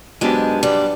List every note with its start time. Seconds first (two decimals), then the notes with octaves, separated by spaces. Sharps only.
0.21 G#2 F#3 G#3 B3 D4 G4
0.63 G2 G3